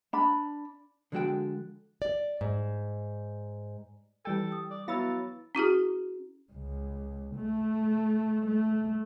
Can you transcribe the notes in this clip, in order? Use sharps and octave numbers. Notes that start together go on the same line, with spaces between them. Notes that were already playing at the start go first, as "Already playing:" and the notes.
D4 B5
D3 F3 G#3 F#4 A4 G5
D5
G#2
E3 G3 A4 G5
D#6
D5
F#3 B3 E4 F5 B5 E6 A6
C#4 E4 F#4 G#4
C#2
A3
A3